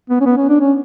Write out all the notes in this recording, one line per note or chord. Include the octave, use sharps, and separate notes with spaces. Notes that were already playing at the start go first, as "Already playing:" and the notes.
B3
C#4
B3
C#4
D4
C#4